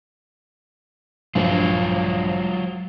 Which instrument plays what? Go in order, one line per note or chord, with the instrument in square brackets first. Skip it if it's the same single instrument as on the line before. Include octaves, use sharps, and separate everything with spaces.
[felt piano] A#1 G2 [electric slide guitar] F#3 F4